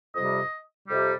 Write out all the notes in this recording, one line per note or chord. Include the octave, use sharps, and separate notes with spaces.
F2 C3 G3 D#5
F2 C3 G3